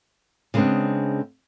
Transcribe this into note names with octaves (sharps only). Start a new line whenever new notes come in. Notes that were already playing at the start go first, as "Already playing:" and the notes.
C#3 G#3 A3 B3 C4 D4